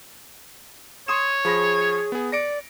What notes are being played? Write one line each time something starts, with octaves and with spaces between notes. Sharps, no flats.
C#5 C6 D#6 E7
F3 G#4 B5 A#6
B3 G#4
D5 A#6 C#7 D7